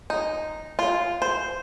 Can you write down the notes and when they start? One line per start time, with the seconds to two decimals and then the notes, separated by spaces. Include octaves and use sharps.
0.10 D#4
0.79 F4
1.22 C5